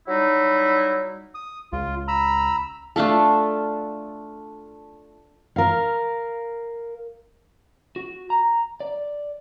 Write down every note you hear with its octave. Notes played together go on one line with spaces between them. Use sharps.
F#3 G3 D#4 E4
D#6
C#2 F4
A#5 B5 E6
A3 D4 F4 A4
A#4 F5
F#4
A#5
D5